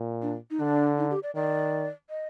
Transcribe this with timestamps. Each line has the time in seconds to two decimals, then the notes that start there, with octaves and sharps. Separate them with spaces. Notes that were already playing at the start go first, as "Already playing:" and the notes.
Already playing: A#2
0.22 D4
0.50 D#4
0.60 D3 D4
0.98 D#4
1.11 G4
1.23 D5
1.35 D#3 D5
2.10 D#5